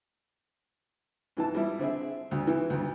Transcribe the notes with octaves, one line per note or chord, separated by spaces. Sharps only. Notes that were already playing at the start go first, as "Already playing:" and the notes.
G#2 E3 A5
G3 E4
D3 C4 G#4 E5
D2
E3
D2 G2